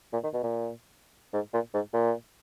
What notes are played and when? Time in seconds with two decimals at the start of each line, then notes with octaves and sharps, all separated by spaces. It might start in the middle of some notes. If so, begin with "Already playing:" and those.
0.13 A#2
0.23 D#3
0.33 B2
0.43 A#2
1.33 G#2
1.53 A#2
1.74 G#2
1.94 A#2